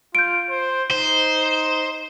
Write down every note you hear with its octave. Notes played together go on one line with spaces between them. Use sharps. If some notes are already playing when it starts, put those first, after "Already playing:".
F4 G6 D7
C5
D#4 C5